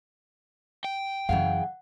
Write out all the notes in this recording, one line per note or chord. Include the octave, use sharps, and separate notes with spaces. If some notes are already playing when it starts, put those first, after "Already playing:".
G5
F#2 C#3 E3 G#4 F5 F#5